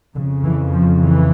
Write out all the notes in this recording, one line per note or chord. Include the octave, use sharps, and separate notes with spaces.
F2 C#3 D3
E3
F3
E3